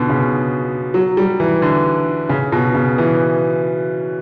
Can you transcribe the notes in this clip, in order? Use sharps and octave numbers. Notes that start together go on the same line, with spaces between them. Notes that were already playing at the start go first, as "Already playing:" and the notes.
Already playing: B2 D3
C#3
F#3
G3
E3
D3
C#3
B2
C#3
E3